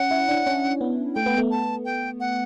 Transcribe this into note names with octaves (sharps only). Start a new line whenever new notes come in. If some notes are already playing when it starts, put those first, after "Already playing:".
Already playing: C#4 F#5
E4
D4
C#4
B3
A3 G5
B3
A3
A5
G5
F#5